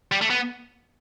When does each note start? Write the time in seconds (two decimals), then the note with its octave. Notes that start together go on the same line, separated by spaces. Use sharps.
0.12 G3
0.21 A3
0.30 B3